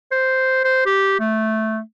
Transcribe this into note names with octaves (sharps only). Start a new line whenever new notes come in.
C5
C5
G4
A3